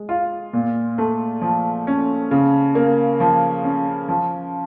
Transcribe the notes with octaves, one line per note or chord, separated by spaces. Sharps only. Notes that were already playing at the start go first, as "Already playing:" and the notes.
Already playing: G#3
F4
A#2
A3
F3
C#4
C#3
A#3
F3
C#4
F3